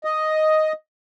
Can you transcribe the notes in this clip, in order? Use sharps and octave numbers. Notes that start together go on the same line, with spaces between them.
D#5